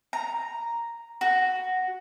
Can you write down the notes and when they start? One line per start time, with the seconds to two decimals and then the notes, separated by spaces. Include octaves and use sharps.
0.13 A#5
1.21 F#4